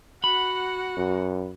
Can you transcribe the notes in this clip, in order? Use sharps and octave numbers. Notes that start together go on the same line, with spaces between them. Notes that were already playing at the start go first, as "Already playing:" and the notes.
F#4 F#5 B5
F#2